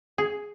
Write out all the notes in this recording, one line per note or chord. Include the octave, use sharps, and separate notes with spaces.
G#4